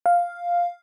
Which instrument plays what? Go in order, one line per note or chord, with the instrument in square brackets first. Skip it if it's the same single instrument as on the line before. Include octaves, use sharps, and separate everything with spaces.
[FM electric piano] F5